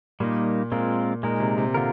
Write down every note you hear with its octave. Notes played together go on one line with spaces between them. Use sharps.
A#2 G3 A#3 D#4
A#2 G#3 C4 F4 A#4
A#2 G#3 D#4 A#4
C3
C3
D3 F4 A#4